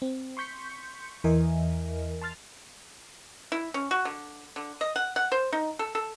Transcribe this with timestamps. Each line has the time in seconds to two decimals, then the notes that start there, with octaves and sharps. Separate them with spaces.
0.02 C4
0.37 C6 C#6 G6 B6 C#7
1.24 E2 E3 A#4 D#5 E5 G#5
2.21 A5 C6 F6 A6
3.52 E4
3.74 C#4
3.91 F#4
4.05 D3
4.56 D3
4.81 D#5
4.96 F#5
5.16 F#5
5.32 C5
5.53 D#4
5.79 A4
5.95 A4